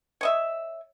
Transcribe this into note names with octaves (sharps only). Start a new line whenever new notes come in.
C#5 D#5 E5